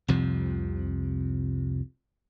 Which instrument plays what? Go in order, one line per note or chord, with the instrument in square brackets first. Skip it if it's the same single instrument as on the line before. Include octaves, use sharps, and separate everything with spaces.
[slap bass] C2 F2 C3 F3